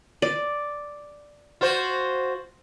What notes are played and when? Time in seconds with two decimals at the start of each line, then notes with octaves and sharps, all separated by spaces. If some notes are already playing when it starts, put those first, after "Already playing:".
0.22 D5
1.61 F4 F#4 C5